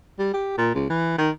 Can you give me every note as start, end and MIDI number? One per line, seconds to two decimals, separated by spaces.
0.19 0.33 55
0.33 0.56 67
0.58 0.72 46
0.75 0.89 37
0.90 1.17 52
1.18 1.30 51